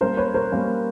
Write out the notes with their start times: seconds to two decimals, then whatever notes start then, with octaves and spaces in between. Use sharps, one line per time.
0.01 G3 A#3 C#4 A#4 C5
0.17 B4 C#5
0.34 A#4 C5
0.52 G3 A#3 C#4